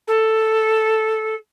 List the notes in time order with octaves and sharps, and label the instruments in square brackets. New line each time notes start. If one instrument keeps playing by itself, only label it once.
[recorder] A4